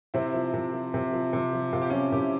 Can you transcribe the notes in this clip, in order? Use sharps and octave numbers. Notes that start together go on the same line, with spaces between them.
C3 C4 E4
F3
C3
F3
C3
F3
C3
F3
C3 F4
G4
F3 C#4 F4
C3 E4 G4